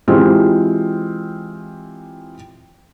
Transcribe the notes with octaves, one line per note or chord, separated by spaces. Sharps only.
E3 G#3 C4 F4 G4